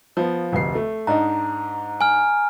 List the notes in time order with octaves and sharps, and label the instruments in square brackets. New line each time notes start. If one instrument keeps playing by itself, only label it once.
[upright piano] F3 B3
F1 D2 C7
A3
[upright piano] G#2 D4 D#4 [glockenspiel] A#5
[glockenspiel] G#5 F6